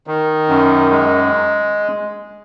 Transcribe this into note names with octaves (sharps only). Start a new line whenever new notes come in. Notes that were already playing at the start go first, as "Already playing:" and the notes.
D#3
F#2
G#3